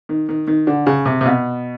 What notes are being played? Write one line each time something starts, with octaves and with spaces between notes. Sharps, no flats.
D#3
D#3
D#3
D3
C#3
C3
C3
B2